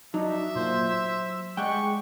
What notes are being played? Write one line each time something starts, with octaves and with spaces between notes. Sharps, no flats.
F#3 D4 D#4 E5
A#2 C5
C5 E6
G#3 G4 D5 F#5 G5 C#6